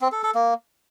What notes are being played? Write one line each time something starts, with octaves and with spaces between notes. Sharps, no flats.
C4
A4
A4
A#3